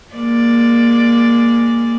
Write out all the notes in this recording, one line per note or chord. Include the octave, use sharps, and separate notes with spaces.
G#3 A#3 D5